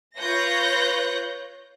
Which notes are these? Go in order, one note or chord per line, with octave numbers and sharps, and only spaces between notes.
F4 B4 C#5 F#6 G6 A#6